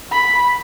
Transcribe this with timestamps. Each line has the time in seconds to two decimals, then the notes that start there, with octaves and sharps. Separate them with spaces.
0.12 B5